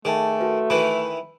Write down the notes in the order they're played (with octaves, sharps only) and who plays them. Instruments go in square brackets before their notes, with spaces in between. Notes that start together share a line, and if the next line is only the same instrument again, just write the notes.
[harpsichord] D#3 [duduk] A3 [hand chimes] G#4 G#5 A5
[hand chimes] F#4 A4 B4
[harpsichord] D#3 E3 [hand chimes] B5